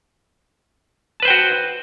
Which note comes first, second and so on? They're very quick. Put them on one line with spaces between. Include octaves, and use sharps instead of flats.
A5 B4 C5 G5 F#4